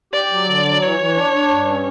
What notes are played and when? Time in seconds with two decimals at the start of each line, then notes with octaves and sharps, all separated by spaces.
0.13 G4 D5
0.31 F#3
0.49 D3
0.65 F#3
0.82 E3 C#5
1.00 E3
1.16 D4
1.33 D4
1.51 G2
1.68 C#4